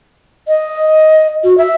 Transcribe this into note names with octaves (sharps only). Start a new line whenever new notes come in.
D#5
F#4
E5